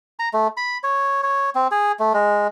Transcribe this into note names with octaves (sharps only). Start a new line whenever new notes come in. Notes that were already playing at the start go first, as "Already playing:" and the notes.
A#5
A3
B5
C#5
C#5
C4
G#4
A3
G#3